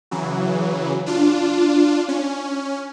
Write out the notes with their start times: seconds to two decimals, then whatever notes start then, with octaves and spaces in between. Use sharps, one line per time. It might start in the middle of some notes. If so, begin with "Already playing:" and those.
0.11 C#3 E3 F#3
1.06 D4 F4
2.08 C#4